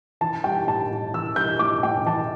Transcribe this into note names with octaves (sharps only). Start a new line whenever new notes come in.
E3 A5
G3 G5
A2 A5
A2
E3 E6
G3 G6
A2 D6
A2 G5
E3 A5